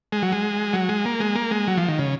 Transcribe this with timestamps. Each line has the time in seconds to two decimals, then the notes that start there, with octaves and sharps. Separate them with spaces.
0.12 G#3
0.23 F#3
0.32 G#3
0.73 F#3
0.89 G#3
1.06 A#3
1.20 G#3
1.36 A#3
1.51 G#3
1.68 F#3
1.77 F3
1.89 D#3
1.99 C#3